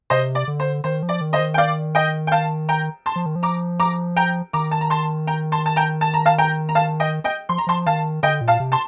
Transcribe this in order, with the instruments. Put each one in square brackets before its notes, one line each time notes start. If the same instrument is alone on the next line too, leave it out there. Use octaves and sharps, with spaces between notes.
[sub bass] C3 [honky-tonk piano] C5 D#5
[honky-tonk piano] D5
[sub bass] D3
[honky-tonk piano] C5
[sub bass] D#3 [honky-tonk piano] C5
[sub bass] F3
[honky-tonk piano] D5
[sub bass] D#3
[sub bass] D3 [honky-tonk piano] C5 D#5
[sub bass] D#3
[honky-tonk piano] G5
D5 F5
D#5 G5
G5
F5 A5
G5 A#5
A5 C6
[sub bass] F3
D#3
F3
[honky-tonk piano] A#5 D6
A#5 D6
G5 A#5
[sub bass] D#3 [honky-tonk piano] A#5 D6
[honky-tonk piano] A5
A#5
A5 C6
G5 A#5
A5 C6
A5
G5 A#5
A5
A#5
F5 A5
G5 A#5
A#5
F5 A5
D#5 G5
D#5 G5
[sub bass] F3 [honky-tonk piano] C6
[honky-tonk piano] A#5
[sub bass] F3 [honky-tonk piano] A5 C6
[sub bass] D#3 [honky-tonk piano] F5 A5
[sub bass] D3 [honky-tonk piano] D#5 G5
[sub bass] A#2
[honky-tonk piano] F5 A5
[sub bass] C3
[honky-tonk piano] A5 C6